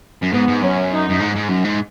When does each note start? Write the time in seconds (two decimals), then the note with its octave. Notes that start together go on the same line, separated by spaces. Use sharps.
0.23 F#2
0.33 G#2 B3
0.49 G#2
0.63 F#2 C#4
0.92 D#4
1.10 F#2
1.20 G#2
1.36 G#2
1.50 F#2
1.65 G#2